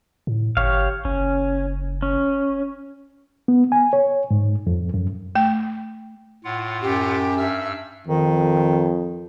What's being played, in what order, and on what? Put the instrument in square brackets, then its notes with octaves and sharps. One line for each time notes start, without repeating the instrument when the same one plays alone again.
[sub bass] A2
[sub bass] G1 [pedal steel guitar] G4 C#5 F5
[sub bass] F#1 [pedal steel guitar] C#4
[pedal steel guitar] C#4
[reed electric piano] B3
G#5
C#5
G#2
F2
F#2
[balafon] A3 G5
[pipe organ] A2 F4 F#5
[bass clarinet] F#2 [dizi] G4
[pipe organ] G2 E6 F6 [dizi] E5
[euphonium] F2 [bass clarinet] D#3